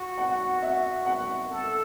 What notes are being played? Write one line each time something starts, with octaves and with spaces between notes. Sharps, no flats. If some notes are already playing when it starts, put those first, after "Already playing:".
Already playing: F#4
F#5
E5
F#5
A4